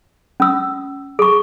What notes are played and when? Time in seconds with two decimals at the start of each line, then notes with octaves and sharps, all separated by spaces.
0.40 C#4 E6
1.19 G#4 C#6